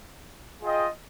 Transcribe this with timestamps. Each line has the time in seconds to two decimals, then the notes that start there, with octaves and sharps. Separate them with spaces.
0.61 F4 G#4 D#5 G5